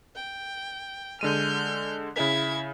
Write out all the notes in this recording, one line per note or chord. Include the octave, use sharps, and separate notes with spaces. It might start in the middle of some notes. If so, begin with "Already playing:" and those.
G5
D3 G#3 F6 G6 D#7
C#3 E4 G#6 B6